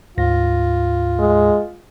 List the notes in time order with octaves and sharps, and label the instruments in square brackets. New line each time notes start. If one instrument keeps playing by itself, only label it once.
[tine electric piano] D2 G#2 A#6 [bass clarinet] F4
[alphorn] G#3